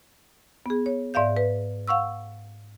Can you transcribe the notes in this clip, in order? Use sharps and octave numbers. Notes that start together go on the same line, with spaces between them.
B3 G#4
C#5
G#2 D5 E5 F5 G6
B4
F5 F#5 C#6 E6